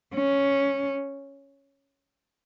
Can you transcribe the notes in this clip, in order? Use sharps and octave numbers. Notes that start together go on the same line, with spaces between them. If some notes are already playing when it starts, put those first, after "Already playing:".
C#4